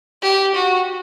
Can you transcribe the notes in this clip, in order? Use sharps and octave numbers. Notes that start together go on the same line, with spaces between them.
G4
F#4